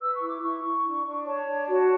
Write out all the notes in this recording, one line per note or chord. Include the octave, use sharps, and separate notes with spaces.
B4 E6
C#6
E4
D6
E4 C#6
E4
D4
D4
C#5 A5
D4
F#4